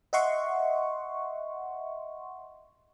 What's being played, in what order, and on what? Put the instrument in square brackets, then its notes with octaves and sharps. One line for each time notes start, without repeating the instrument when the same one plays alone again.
[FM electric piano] D#5 E5 F#5 C6 C#6